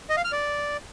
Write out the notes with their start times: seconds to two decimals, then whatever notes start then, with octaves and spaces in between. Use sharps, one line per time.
0.10 D#5
0.17 F5
0.25 F6
0.32 D5